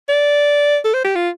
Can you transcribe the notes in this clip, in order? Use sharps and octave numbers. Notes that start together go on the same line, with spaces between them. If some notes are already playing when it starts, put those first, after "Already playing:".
D5
A4
C5
G4
F4